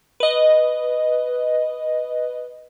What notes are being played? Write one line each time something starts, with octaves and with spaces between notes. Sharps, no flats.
B4 D#5